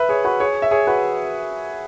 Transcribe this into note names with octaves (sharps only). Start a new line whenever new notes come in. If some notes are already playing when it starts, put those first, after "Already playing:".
Already playing: B4 E5
G#4 C#5
F#4 B4
G#4 C#5
E5
G#4 C#5
F#4 B4